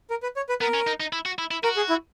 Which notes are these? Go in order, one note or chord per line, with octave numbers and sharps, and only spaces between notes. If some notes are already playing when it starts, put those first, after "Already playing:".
A#4
B4
C#5
B4
B3 A#4
C#4
D#4
D#4
E4
F#4
E4
E4
F#4 A#4
G#4
E4